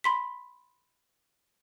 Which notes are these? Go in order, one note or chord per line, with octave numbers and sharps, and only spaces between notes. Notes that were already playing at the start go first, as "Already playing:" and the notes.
B5 C6 B6